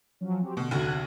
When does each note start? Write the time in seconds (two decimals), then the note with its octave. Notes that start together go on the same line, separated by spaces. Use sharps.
0.20 F3 F#3 C#4
0.41 C4 F#4 G4
0.57 B2 D3
0.71 F1 D2 F#4 F#6 G#6